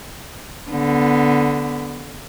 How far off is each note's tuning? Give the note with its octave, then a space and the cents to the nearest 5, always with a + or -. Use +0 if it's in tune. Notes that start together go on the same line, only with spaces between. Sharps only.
D3 -15 B3 +0